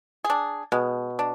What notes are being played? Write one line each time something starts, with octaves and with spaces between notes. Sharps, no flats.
G#4
D4
B2 G#3
D4